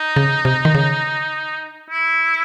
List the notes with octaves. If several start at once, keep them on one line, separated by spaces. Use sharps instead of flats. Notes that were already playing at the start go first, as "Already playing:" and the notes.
Already playing: D#4
C#3
C3
D#3
C#3
E4